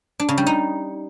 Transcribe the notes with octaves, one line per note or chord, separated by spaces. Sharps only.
D4
C#3
G3
D#4